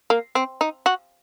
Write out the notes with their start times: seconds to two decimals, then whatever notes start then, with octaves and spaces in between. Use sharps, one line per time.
0.10 A#3
0.35 C4
0.61 D#4
0.86 F#4